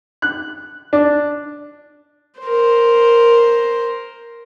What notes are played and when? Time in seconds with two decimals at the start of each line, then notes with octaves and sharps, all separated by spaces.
0.22 F#6
0.93 D4
2.41 A#4 C5